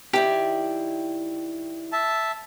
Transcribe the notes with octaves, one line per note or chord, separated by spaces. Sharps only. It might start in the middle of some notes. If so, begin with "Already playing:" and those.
D#3 E4 G4 D5
E5 A5